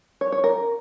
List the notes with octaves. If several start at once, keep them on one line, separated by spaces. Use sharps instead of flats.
C#5
C#5
A#4